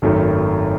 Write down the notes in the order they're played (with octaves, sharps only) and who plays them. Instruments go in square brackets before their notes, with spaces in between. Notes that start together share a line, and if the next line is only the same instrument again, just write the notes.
[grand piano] G#1 F#2 D#3 A3